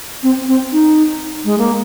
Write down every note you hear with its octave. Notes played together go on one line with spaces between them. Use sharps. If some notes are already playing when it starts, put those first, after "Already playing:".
C4
C4
D#4
G#3
A#3